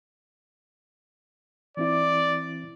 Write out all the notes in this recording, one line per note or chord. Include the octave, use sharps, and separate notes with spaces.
E3 C4 E4 D5